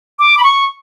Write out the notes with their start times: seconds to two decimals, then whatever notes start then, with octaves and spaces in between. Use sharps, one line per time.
0.19 D6
0.38 B5
0.43 C#6